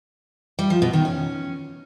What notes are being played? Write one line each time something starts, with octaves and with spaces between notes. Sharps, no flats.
G3
F3
B2
D#3
C#4